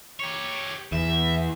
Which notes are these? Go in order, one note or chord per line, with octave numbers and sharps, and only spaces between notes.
G4 C#5
E2 E5